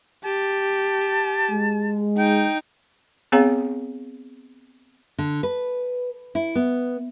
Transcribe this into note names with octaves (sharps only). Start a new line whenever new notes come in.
G4 A5
G#3
D#4 G5
B3 C4 G#4 C#5 F5 A#5
D3
B4
E4
B3